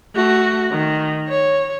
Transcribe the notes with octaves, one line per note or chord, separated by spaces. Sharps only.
A3 F#4
D#3
C#5